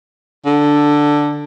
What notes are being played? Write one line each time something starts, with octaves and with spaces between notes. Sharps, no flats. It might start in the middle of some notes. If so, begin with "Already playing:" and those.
D3